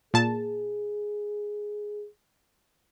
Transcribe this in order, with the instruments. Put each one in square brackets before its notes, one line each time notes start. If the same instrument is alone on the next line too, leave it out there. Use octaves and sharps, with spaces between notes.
[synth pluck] A#2 A5 [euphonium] G#4